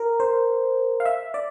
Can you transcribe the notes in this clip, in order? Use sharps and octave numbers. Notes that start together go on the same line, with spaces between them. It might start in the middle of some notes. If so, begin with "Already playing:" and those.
Already playing: A#4
C5
F5
E5
D5